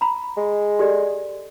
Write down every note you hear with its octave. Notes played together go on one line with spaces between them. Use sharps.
A#5 B5
G#3
G4 A4 D5